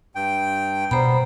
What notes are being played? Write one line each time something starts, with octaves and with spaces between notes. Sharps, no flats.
G2 G5
B2 G3 B3 C5 A#5 B5